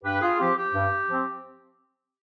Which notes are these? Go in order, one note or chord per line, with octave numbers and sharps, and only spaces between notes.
G2 G4 B4
F4 G#4
F3 C4 G4
G4
G2
F3 C4